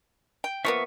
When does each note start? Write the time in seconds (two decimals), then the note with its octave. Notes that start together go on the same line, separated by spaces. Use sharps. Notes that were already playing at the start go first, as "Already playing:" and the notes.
0.44 G5
0.65 F3 A#3 B3 E5 C#6